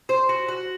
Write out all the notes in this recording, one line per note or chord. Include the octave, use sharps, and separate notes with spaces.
C5
F#4
F#4